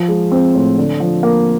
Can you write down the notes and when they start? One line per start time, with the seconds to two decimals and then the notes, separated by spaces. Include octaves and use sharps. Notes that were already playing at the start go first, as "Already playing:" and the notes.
Already playing: F3
0.08 G#3
0.32 C4
0.54 A2
0.77 D3
1.00 F3
1.23 A#3